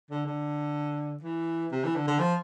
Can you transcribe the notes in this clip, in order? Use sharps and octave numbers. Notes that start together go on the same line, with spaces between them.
D3
D3
E3
C3
E3
D3
D3
F3